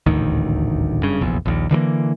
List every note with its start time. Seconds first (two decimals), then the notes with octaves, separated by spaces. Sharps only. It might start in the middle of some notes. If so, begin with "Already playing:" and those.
0.06 D#1 A1 D2 D#3
1.03 F#1 G2 C#3
1.21 F1 A#1 E2
1.46 A#1 D#2
1.71 D3 E3 G3 A#3